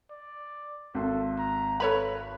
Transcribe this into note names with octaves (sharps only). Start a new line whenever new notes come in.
D5
G#1 A4 C6
A#5
A4 B4 C#5 B5